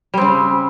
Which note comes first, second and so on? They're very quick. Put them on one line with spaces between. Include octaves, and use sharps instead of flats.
G3 C4 C#3